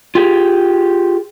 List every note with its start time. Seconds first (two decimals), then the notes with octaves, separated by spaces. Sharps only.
0.15 F4 G4 G#4